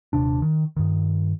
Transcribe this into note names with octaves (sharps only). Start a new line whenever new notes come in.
D#1 C3 D4
D#3
G2 D#3